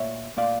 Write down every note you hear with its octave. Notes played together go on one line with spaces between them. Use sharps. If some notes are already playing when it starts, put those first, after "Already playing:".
Already playing: A#2 A3 C#5 E5
A#2 A3 D5 F5